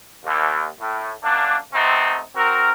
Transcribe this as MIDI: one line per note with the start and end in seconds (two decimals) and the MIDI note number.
0.25 0.68 39
0.80 1.11 45
1.23 1.56 42
1.23 1.56 58
1.23 1.56 62
1.73 2.20 48
1.73 2.20 57
1.73 2.20 59
1.73 2.20 60
1.73 2.20 63
2.36 2.72 60
2.36 2.72 66
2.36 2.72 70